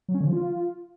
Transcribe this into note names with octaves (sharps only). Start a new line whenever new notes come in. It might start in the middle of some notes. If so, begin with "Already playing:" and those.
F#3
C#4
D3
F3
F4